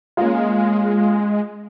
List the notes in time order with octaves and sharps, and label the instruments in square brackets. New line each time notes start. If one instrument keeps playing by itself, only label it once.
[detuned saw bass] G#3 [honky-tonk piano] A#3 C#4 F4